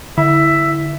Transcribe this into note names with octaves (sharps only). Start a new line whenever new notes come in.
D3 E4 E5